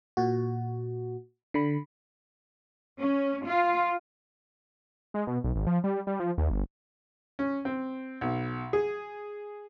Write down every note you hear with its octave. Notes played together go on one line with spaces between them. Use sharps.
A#2 F#4
D3 B5
C#4
F4
G#3
B2
B1
G#1
F3
G3
G3
F3
D#2
G1
C#4
C4
B1
G#4